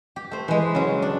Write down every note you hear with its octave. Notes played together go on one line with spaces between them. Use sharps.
G4
A3 C5
E3 G#3
C#3 F#3
D4